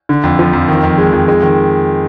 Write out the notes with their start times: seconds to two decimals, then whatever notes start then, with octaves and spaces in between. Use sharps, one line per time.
0.09 D3
0.24 F2
0.39 F3
0.53 F2
0.68 D#3
0.83 F2
0.98 G#3
1.13 F2
1.28 G#3
1.43 D#3